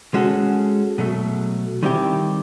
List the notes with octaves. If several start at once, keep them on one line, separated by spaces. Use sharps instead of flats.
G#3 C#4 F#4 A4
B2 F#3 A3
D#3 G3 C4 E4 G4